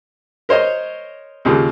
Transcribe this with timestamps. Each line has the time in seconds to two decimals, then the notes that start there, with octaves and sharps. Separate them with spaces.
0.49 A#4 C5 C#5 D#5
1.45 D#2 A#2 C#3